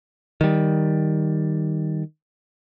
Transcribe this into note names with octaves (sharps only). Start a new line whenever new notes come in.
D#3 G3